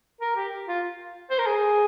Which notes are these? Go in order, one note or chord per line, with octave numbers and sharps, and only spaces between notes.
A#4
G4
F4
C5
A#4
G#4